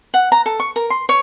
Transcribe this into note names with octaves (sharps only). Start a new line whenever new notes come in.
F#5
A#5
A4
C#6
A#4
C6
C#5